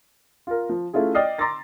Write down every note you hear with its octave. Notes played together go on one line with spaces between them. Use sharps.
F4 A#4
F3
A3 C#4 E4 F4 G#4
D5 D#5 G5 D#6 F6 C7
A#5 C6 D6 E6 A6 A#6